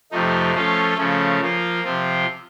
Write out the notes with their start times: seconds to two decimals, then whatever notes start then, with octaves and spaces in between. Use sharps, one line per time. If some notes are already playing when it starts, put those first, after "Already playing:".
0.11 F2 C3 F3 A3 D#4
0.54 F3 A3 C#4 F4 A4
0.97 C#3 F3 A3 C#4
1.41 F3 A#3 F4
1.84 C3 F3 C4 F4